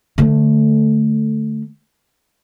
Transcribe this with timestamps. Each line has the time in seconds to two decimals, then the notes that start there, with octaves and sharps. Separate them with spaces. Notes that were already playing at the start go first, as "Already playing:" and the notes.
0.18 D3 A3